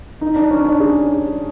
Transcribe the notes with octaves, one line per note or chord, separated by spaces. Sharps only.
D#4
D4
C#4
D4
G#4